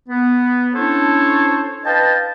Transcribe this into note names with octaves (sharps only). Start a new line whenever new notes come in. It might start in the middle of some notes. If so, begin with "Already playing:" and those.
B3
C#4 D4 E4 A4 C5 C#5
B4 D#5 F5 G5 A5